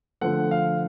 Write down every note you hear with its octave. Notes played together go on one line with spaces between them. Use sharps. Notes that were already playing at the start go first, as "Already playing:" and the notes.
D3 F3 A3 F#5
F5